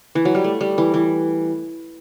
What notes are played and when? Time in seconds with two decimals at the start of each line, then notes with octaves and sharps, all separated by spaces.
0.15 E3
0.25 F#3
0.35 G3
0.44 A3
0.61 G3
0.78 E3
0.94 E3